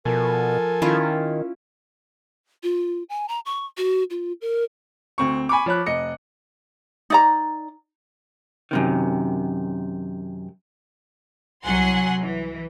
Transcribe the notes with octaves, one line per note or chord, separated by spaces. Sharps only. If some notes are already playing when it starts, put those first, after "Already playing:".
B2 F3 A4 A#4 G#5
D#3 C#4 E4 F4
F4
G#5
A#5
C#6
F#4
F4
A#4
D2 C4 C#6
G#5 B5 C#6 D6
F3 C#5 B5 F#6
F1 D#5 C#7
D#4 D5 A#5
F#2 C3 D#3
C2 F#3 F#5 G#5 C6
E3